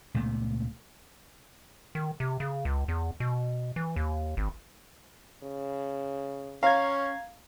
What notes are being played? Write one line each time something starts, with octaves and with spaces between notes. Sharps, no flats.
C#2 A#2 A3 B3
D#3
C3
C#3
C#2
E2
B2
E3
D#2
G#1
C#3
C#4 F5 A#5 G#6